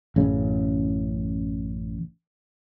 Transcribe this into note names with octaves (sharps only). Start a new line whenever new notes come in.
A1 F#2 C#3